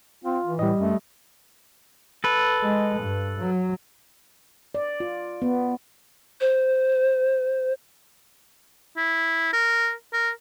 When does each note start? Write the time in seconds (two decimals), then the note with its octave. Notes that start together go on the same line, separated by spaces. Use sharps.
0.24 C4 F4
0.43 E3
0.59 A2 G3 D#5
0.80 F#2 A3
2.24 A4 B4
2.61 G#3
3.00 G2
3.39 F#3
4.75 D5
5.00 F4
5.42 B3
6.40 C5
8.97 E4
9.53 A#4
10.13 A#4